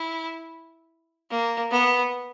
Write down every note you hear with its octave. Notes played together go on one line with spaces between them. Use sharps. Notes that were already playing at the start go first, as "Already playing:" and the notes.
Already playing: E4
A#3
B3